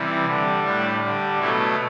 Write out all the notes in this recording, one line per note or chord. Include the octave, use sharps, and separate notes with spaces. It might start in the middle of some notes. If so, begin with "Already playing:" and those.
Already playing: C3 E3 G3
D3 G3
A2 G3 D4
D3 G3
B2 F#3 A3 E4